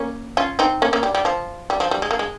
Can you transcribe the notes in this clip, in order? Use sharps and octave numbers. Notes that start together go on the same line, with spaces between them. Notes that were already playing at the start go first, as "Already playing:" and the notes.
Already playing: A#3 C#4
C#4 F4
C4 D#4
A#3 C#4
A#3 C#4
G3
G3
F3
G3
F3
G3
G#3
A#3
G#3